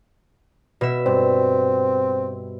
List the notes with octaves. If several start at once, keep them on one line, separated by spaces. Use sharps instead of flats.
B2 E5
G2 C4